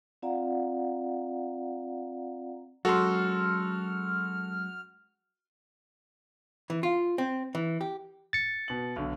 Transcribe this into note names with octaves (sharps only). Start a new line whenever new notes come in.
C4 F4 D5 F5 F#5 A#5
F#3 G#3 C#4 F#4 A4 C6 F6
E3
F4
C4
E3
G4
A6 C#7
B2 F#7
B1 D3